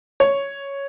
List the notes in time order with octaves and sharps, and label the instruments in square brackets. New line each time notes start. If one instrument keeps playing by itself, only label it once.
[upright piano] C#5